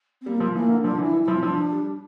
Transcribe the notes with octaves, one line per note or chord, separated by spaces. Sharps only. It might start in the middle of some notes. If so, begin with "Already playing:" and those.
C4
G3 A#3
F3
E3 A#3
D3
F3 D4
D3
E3
E4
E3
F3 E4
C4
F3 D4
G3